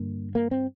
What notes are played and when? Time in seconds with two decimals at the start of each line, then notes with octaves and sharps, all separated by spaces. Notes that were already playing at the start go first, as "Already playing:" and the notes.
Already playing: G2 D3 A#3
0.35 A#3
0.51 C4